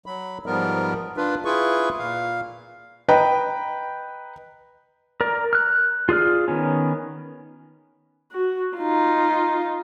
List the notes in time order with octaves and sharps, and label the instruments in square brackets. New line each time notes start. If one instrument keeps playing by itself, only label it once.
[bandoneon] F#3 B5
G#2 F3 G3 B3 A#4
D4 F4 B4
E4 F4 G#4 B4 C#6
A#2 F5
[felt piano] B4 D#5 G5 A#5
[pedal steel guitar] A#4 D5
F6 F#6
F4 G#4 D5 F6
D#3 B3 C#4
[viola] F#4
D#4 F4